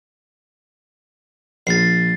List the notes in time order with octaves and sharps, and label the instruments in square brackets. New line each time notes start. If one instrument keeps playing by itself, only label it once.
[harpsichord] A#1 [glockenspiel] A6 C7